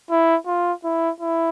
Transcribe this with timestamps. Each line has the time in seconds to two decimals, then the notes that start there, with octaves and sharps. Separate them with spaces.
0.10 E4
0.47 F4
0.84 E4
1.20 E4